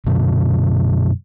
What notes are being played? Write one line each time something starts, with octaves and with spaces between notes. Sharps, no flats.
F#2 B2 D3 F#3